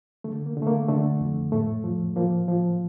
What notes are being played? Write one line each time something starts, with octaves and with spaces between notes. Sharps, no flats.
D3 A3
A#3
D3
A3
A#3
D3 A3
F2
A2 A3
F3
F3 A#3
F3